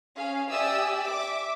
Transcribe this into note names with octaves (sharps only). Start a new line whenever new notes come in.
C#4 G#4 F5
G4 D5 E5 G#5 D#6 E6
E5 D6